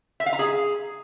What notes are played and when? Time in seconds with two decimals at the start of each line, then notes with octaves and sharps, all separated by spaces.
0.20 E5
0.26 F5
0.33 A#5
0.39 G#4